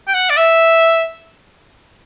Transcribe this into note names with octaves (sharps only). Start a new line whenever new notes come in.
G5
F#5
D5
E5